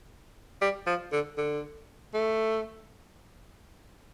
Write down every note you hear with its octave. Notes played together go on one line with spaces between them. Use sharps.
G3
F3
D3
D3
A3